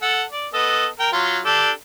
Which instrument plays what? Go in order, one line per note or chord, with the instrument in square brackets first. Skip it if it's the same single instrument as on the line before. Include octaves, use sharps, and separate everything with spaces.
[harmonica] A4 F#5
D5
B3 A4 D#5
A#4 G5
F#3 F4
D4 G4 A4